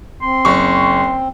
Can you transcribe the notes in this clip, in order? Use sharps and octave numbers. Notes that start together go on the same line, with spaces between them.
C4 C6
F#1 C#6